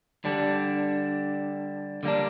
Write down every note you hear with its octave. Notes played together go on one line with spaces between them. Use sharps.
D3 G3 D4
D3 G3 A#3 D4